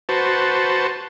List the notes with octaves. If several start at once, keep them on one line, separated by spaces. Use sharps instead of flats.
F#4 B4 C5 A5